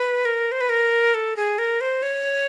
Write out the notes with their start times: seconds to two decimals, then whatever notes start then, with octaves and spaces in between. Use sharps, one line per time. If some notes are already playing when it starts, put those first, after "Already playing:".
Already playing: B4
0.25 A#4
0.52 C5
0.61 B4
0.69 A#4
1.14 A4
1.36 G#4
1.58 A#4
1.81 C5
2.03 C#5